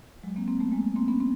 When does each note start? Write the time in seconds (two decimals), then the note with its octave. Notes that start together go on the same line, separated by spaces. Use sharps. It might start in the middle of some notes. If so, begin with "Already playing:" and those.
0.23 F#3 G#3
0.36 A#3 C4
0.48 A#3 C4
0.60 A3 B3
0.72 G#3 A#3
0.96 A#3 C4
1.08 B3 C#4
1.20 C4